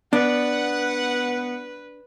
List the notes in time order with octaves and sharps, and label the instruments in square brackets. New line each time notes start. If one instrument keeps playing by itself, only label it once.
[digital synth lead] B3 [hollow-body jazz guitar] D4 [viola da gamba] B4 [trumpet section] F#5